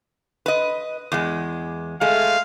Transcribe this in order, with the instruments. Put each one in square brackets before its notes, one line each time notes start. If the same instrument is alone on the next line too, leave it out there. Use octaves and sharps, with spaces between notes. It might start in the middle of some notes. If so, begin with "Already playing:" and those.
[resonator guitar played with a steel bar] B4 D#5
E2 G#3
[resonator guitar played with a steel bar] G#3 A3 [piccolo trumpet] F5